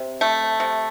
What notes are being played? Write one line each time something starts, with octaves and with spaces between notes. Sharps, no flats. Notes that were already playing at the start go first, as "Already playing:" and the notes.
Already playing: C3
A3
C3